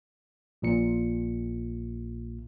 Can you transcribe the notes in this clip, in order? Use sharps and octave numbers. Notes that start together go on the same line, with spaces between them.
A#1 A#2 C#7